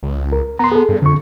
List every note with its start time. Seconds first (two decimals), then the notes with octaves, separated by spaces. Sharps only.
0.03 C#2
0.32 A#4
0.59 B3 A#5 C6
0.72 G#4 A4
0.89 G2
1.02 F2 D3 C#6